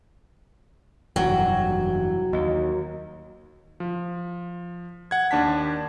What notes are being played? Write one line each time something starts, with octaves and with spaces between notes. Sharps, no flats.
F1 G2 E3 F#3 E4 F#5 G5
D#2 D#5
F3
F#5 G#6
D#2 D4 A5 B6